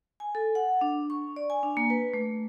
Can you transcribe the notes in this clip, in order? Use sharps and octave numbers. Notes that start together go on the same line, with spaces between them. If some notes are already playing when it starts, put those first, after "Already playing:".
G#5
A4
F#5
D4
C#6
D5
G#5
D4
A#3
B4
A3